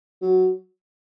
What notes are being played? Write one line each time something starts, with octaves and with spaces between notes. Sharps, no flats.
F#3